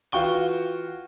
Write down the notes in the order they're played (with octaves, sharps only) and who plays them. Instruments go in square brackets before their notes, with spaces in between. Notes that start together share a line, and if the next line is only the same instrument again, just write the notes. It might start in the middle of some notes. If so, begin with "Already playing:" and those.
[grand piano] E3 F4 F#4 G5 C#6 G7